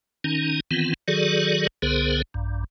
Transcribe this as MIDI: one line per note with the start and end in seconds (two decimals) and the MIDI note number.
0.24 0.60 51
0.24 0.60 61
0.24 0.60 63
0.71 0.94 51
0.71 0.94 52
0.71 0.94 59
0.71 0.94 60
0.71 0.94 65
1.08 1.67 51
1.08 1.67 54
1.08 1.67 66
1.08 1.67 68
1.08 1.67 69
1.08 1.67 74
1.82 2.22 36
1.82 2.22 50
1.82 2.22 59
1.82 2.22 68
1.82 2.22 70
1.82 2.22 72
2.34 2.64 34
2.34 2.64 43